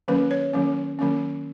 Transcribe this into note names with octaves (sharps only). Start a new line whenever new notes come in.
D#3 F#3 A#3 C#4 B4
C#5
D#3 F#3 A#3 C#4
D#3 F#3 A#3 C#4